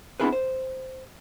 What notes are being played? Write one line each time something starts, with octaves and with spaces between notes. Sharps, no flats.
B3 C4 D4 E4 G#4 B4
C5